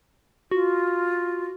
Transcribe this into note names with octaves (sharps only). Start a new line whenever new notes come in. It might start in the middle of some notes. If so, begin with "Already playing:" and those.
F4 F#4